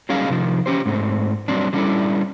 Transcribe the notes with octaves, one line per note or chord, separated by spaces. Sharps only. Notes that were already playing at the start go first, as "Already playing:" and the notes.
F#3 G3 C#4 D#4 G#4 F5
C3 D#3 F3
C#4 G4 C5
G#2 A3 C4
F#3 G3 C4 D4
F#3 G3 C#4 D4 E4 A4